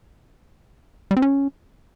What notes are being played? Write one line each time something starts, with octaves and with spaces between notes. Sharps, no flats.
G3
C4
C#4